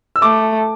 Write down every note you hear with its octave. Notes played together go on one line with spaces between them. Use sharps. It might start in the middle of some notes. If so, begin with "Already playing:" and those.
E6
A3 D6